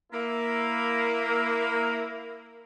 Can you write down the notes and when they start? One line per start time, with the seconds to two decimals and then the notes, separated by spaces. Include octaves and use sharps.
0.12 A#3 E4